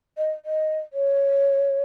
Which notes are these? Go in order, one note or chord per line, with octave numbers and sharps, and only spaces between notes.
D#5
D#5
C#5